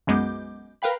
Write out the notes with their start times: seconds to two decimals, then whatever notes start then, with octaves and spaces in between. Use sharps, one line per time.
0.07 B1 F#2 G#3 B3 D6 G6
0.82 A#4 B4 F5 G5 B5